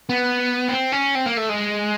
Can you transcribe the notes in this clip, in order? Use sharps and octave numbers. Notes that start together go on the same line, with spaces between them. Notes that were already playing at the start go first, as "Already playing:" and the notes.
B3
C4
C#4
C4
A#3
A3
G#3